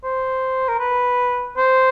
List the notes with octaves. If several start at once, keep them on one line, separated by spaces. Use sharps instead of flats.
C5
A#4
B4
C5